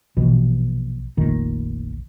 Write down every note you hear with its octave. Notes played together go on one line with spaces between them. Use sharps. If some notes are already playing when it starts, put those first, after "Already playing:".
A#1 B2 E3
F1 A#1 D#3